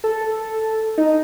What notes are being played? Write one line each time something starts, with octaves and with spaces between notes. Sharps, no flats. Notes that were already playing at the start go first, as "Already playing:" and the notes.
A4
D#4